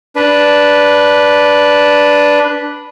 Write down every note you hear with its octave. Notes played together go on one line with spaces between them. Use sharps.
D4 B4